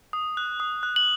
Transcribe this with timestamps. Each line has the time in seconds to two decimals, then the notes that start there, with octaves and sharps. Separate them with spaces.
0.13 D#6
0.37 F#6
0.60 D#6
0.83 F#6
0.96 F#7